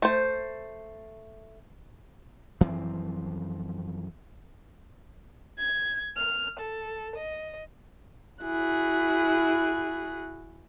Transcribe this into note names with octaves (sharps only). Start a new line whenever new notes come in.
A3 C5
F#2 E3 F3 C4
G#6
F6
A4
D#5
E4 F#4 G#4 F#6